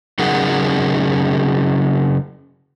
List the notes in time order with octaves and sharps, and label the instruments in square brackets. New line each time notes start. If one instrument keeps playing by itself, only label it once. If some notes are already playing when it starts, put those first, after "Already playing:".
[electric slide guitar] C#3 F#3 D#4 G#4 A#4 F#5